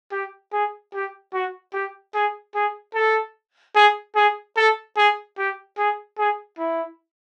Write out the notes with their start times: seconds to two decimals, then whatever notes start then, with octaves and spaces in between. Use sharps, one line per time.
0.12 G4
0.52 G#4
0.93 G4
1.33 F#4
1.73 G4
2.14 G#4
2.55 G#4
2.94 A4
3.75 G#4
4.16 G#4
4.56 A4
4.96 G#4
5.38 G4
5.78 G#4
6.18 G#4
6.58 E4